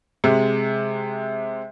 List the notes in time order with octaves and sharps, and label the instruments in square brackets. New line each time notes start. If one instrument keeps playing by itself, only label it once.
[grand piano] C3 G#3